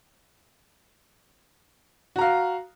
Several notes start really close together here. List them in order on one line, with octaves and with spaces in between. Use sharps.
F#4 A#5 F5